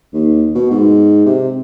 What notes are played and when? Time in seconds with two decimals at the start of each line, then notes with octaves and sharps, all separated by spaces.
0.14 D#2
0.55 B2
0.71 G#2
1.26 C3